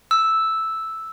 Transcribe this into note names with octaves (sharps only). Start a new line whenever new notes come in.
E6